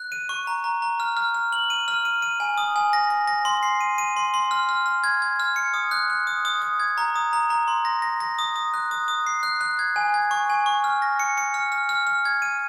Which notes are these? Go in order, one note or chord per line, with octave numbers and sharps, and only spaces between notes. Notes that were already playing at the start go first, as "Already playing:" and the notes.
Already playing: F#6
D#7
C#6
A#5
A#5
A#5
F6
F6
F6
F#7
D#7
F6
D#7
D#7
G#5
D#6
G#5
A#6
A#6
A#6
C6
C7
D#7
D#7
C6
C6
F6
F6
F6
G#6
G#6
F6
C#7
D#6
F#6
F#6
D#6
D#6
D#6
G#6
A#5
D#6
A#5
A#5
C6
A#6
A#6
A#6
D#6
D#6
F#6
D#6
D#6
C7
F#6
F#6
G#6
G#5
G#6
C#6
G#5
C#6
F6
A#6
C#7
C#7
F6
F6
F6
F6
G#6
D#7